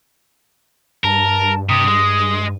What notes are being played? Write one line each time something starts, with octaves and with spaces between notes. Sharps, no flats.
G2 A#4 A5
C3 G4 D#6
G#3